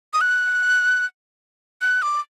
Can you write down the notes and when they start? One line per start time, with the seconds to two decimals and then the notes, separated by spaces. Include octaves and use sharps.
0.13 D#6
0.21 F#6
1.81 F#6
2.02 D6